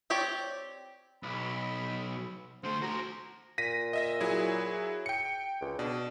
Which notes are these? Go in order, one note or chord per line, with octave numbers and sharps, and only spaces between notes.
C4 G4 C#5 D5 G5
B1 B5
D3 A3 C5
F#4 C5 A#5
A#2 A#6 B6 D#7
D#5 E5 A#6
F#3 E4 G#4
G5 C#7
C#2
B2 D4